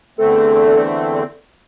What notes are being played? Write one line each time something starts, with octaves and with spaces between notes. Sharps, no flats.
E2 D3 A3 C4 A4